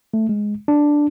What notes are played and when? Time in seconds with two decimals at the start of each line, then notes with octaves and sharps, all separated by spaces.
0.14 A3
0.29 G#3
0.68 D4